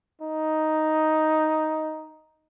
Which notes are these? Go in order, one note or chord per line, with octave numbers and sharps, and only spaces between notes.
D#4